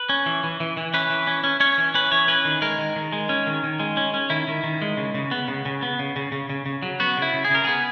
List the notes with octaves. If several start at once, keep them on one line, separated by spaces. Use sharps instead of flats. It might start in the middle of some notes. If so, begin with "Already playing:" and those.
Already playing: B4
C#4
E3
E3
E3
E3
C#4 B4
E3
C#4
C#4
C#4 C#5
E3
C#4 B4
E3 C#5
C#4 B4
D#3
G#3 A#4
D#3
D#3
G#3
C#4
D#3
D#3
G#3
C#4
C#4
D#3 E4
D#3
D#3
G#3
C#3
C#3
B3
C#3
C#3
B3
C#3
C#3
C#3
C#3
C#3
F#3
B3 F#4
C#3 E4
C#3
G#4
C#3 A#4
B3 G#4